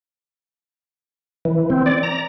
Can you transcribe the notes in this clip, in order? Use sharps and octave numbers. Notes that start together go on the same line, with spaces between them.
E3
C4
D5
A#5